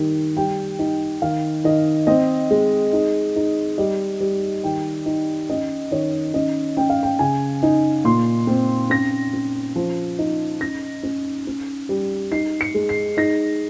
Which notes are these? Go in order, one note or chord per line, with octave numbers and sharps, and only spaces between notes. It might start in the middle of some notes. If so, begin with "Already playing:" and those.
Already playing: D#3 G3
G3 G5
D#4
D#3 F5
D#3 D#5
C4 D#5
G#3
D#4
D#4
G3 D#5
G3
D#3 G5
D#4
C#4 D#5
D#3 C#5
C#4 D#5
C#4 G5
F5
G5
C#3 G#5
D#4
A#2 C6
C4
C#4 A#6
C#4
F3
D#4
C#4 A#6
C#4
C#4
G3
D#4 C7
C#7
G#3
C7
D#4 A#6